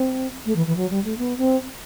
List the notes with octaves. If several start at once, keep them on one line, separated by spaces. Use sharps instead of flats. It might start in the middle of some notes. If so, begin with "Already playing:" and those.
Already playing: C4
A3
E3
E3
F#3
G3
A3
B3
C4